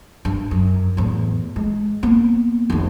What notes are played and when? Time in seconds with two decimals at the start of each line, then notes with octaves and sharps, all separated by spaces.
0.25 G2
0.51 F#2
0.97 E2 A2
1.56 G#3
2.03 A#3 B3
2.70 F1 D#3